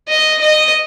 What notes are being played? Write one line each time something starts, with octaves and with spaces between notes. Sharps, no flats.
D#5
D#5